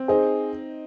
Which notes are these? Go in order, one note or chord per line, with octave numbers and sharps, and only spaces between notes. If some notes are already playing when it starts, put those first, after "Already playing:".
Already playing: C4
D#4 G#4 C5